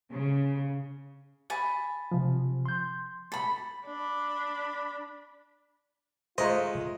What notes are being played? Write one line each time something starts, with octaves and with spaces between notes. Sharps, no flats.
C#3
G#5 A5 B5
C3 F3
C6 G6
A4 B5
D4 B5
G#3 A3 F4 C5 D#5 A#5